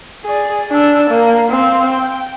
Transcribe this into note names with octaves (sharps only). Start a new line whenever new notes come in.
G#4 D5
D4 E6
A#3
C4 F5
G5